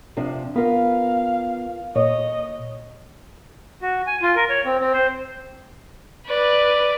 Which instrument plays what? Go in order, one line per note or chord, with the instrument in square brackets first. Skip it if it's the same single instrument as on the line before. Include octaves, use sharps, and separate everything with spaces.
[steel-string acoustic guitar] C3 F3 D4
[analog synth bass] B3 [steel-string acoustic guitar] F4 A#4 B4 [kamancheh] F5
[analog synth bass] A#2 [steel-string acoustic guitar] C#5 [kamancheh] D#5
[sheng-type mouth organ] F#4
G#5
F4
A#4
C#5
C4
C4
C5
[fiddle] B4 D5